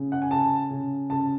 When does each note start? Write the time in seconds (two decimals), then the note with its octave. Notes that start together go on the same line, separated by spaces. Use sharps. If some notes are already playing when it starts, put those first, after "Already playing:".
Already playing: C#3
0.12 F#5
0.22 G#5
0.31 C#3 A5
0.70 C#3
1.09 C#3 A5